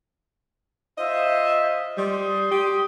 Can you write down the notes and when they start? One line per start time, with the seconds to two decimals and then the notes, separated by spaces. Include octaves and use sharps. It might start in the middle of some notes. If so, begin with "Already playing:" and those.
0.98 F4 C5 D#5 E5
1.98 G3 C6 D#6
2.51 G4